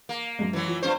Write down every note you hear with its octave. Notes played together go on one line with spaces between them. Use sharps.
A#3
F#2 G#3
E3 F#3
F3
G2 C4 C5